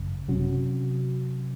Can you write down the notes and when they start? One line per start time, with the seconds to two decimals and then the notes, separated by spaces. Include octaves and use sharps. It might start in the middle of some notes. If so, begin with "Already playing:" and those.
Already playing: G#1 F#2 C#3
0.29 C3 F#3 C#4 F#4